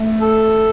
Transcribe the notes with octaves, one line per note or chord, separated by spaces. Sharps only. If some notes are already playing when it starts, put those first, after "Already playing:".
Already playing: A3
A4